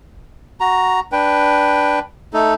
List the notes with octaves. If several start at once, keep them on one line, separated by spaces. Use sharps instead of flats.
F#4 A#5
D4 B4 G5
A3 D#4 A4